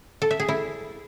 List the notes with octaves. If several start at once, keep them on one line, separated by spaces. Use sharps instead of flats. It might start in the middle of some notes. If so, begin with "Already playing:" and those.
A4
E5
G#4
E4